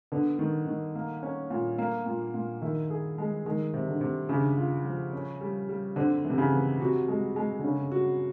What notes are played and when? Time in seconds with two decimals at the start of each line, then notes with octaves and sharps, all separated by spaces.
0.12 D3 B3
0.39 D#3
0.67 D#3
0.95 A#3
1.23 C#4
1.50 A#2
1.78 A#3
2.06 A#2
2.34 A#2
2.62 D#3 E4
2.90 G#4
3.18 G#3
3.46 D#3 G#3
3.74 C3
3.88 D3
4.01 C3
4.29 C#3 D4
4.57 F4
4.85 F3
5.13 C#4
5.41 G3
5.69 G3
5.96 D3 C4
6.25 C3 E3
6.38 C#3
6.53 E3
6.80 C3 F#4
7.08 G#3
7.36 G#3
7.59 D3
7.63 C#3 C#4
7.92 F#4